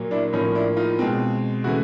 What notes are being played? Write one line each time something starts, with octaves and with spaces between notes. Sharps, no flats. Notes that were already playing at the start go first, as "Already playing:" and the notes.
Already playing: A#2 F#3 A#3
D4 E4
A2 F3 A#3 C#4 D#4
D4 E4
D#4 F4
B2 G#3 C4
C#3 E3 A3 E4 F#4